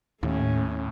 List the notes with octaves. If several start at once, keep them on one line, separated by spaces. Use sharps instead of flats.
D#2 A2 A3 C#4